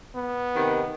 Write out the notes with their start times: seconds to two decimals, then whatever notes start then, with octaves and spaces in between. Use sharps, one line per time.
0.15 B3
0.55 C3 D#3